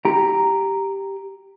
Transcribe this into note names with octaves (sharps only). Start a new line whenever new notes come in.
G4 G5 A#5